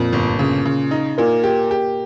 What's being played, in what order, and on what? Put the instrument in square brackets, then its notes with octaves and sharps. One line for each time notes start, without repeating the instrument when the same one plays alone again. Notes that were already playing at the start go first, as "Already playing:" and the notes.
Already playing: [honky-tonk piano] F2 [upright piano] A#2
[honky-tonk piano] G1
C#3
C#3
D#4
[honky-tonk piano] A#2 [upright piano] A#3
[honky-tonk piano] G4
G4